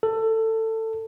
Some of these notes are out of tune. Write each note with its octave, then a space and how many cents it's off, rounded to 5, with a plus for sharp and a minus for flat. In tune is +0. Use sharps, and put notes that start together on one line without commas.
A4 +20